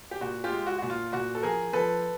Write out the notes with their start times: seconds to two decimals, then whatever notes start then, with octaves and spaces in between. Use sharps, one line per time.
0.11 G4
0.21 A#2 F#4
0.44 F4 G4
0.51 G#3
0.67 F#4
0.78 A#2 F#4
0.90 F4
1.12 A#2 F#4
1.35 A4
1.43 F3 G#4 A#4
1.73 F3 A4 B4